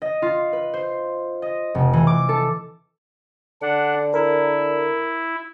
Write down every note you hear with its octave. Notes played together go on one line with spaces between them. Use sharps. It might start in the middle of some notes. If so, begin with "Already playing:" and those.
D#5
F4
B4
C5
D#5
F1
E3
D6
A4
D3 D4 F#5
E4 A#4